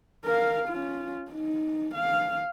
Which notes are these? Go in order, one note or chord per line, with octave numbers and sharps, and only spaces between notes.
A#4 F5
C#4 F4
D#4
F5